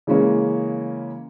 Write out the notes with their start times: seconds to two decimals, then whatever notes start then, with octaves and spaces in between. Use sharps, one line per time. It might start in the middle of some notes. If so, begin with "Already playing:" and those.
0.07 C#3 E3 G#3 A#3 C#4